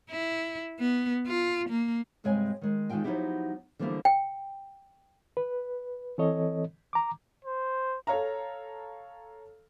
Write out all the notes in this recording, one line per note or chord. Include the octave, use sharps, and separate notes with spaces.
E4
B3
F4
A#3
G2 C3 G#3 C#5 G5 G#5
D#3 G#3
E2 D#3 G#3 F4 G5 G#5
F3 F#3 B3 D#4 E4 G4
D3 E3 F3 G3 A#3 E4
G5
B4
E3 C4 A4 C#5 D#5
A#5 D6
C5
A4 C#5 F5 A#5